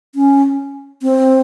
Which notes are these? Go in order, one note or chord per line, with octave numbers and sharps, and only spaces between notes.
C#4
C4